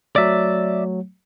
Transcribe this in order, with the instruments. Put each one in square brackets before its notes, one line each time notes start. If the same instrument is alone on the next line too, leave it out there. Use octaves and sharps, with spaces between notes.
[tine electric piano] F#3 A3 [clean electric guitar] D5 E5